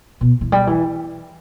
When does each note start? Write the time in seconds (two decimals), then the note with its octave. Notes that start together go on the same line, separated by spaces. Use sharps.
0.21 B2
0.41 E3
0.52 G3
0.67 E3